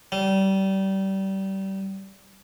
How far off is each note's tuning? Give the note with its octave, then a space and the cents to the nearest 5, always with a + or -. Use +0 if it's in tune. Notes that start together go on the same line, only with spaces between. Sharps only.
G3 -25